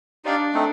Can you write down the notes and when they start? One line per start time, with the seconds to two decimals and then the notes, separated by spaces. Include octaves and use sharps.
0.25 D4 D#4 G4 D5 F5
0.53 A3 C4 D#4 A4